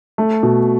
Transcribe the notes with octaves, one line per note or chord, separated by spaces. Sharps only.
A3
B2